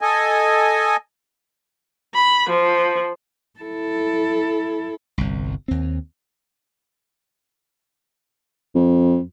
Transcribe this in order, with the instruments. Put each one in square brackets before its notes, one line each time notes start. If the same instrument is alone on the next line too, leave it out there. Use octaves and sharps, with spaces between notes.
[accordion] A4 D#5 G#5
[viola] B5
F3
[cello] E4 A4
[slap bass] G1 C2
D#2 C4
[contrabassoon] F2